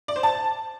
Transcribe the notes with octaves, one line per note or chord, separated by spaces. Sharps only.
D5
C5
A5